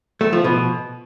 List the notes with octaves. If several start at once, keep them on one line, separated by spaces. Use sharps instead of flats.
A3
F3
B2